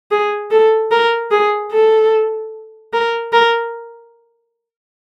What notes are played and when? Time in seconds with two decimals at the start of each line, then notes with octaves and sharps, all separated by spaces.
0.11 G#4
0.51 A4
0.91 A#4
1.31 G#4
1.71 A4
2.93 A#4
3.33 A#4